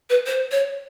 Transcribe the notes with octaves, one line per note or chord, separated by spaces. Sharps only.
B4
C5
C#5